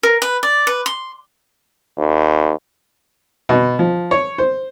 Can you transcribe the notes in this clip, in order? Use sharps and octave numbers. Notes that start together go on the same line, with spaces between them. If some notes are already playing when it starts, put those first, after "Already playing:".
A#4
B4
D5
B4
C6
D#2
B2
F3
C#5
C5